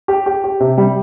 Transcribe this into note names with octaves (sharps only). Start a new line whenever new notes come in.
G4
G4
G4
C3
G3